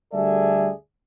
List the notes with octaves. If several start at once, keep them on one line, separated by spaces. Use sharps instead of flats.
D2 G3 G#4 A4 D5 E5